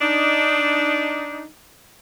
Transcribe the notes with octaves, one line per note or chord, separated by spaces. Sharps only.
D4 D#4